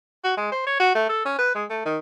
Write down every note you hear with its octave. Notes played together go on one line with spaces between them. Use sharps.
F#4
G#3
C5
C#5
F#4
A3
A4
C#4
B4
G#3
A3
D#3